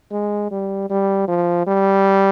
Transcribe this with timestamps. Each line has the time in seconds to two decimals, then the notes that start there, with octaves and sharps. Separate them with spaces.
0.12 G#3
0.51 G3
0.90 G3
1.28 F3
1.67 G3